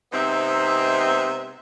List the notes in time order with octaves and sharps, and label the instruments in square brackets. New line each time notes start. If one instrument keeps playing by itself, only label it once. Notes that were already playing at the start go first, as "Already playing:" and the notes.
[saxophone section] G#2 C3 B3 C4 D#4 E5